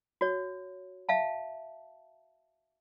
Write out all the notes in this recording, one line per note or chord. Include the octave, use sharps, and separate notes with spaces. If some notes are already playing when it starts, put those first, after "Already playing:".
F#4 C#5
E5 F5 A5